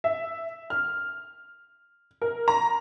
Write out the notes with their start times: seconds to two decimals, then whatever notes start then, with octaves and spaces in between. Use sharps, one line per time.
0.04 E5
0.70 F6
2.22 A#4
2.48 A#5